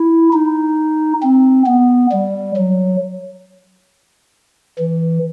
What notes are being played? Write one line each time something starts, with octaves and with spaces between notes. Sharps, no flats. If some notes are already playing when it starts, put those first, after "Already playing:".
Already playing: E4
D#4
C4
B3
G3
F#3
E3